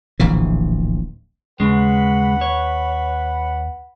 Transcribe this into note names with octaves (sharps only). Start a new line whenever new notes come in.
D1 A#1 E3
D#2 C#3 G#3 B4 F#5 B5
C#5